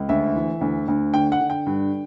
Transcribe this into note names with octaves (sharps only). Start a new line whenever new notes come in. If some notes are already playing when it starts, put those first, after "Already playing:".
Already playing: C#2
D2 E5
E3
D2
D2
D3 G5
F#5
D3
G5
G2